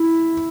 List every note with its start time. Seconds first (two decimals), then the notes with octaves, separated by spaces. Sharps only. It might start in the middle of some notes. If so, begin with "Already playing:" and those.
Already playing: E4